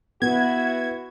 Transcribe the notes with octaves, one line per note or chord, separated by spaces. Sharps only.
B3 E4 F#4 B4 G#6